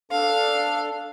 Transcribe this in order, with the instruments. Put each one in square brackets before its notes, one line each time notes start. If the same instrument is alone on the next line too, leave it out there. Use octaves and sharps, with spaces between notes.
[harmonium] D4 A4 [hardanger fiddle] F5